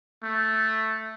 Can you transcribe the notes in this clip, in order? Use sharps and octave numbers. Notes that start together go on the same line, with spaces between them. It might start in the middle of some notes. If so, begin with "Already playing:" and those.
A3